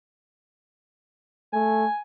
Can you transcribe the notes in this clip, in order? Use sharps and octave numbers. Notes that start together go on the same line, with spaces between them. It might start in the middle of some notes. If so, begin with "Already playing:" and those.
A3 G#5